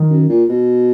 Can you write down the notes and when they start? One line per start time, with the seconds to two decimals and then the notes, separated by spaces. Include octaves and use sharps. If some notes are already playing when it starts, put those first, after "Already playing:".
Already playing: D#3
0.10 F#2
0.29 A#2
0.49 B2